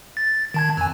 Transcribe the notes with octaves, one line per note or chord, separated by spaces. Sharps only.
A6
D#3 A5 G#6
F2 G#5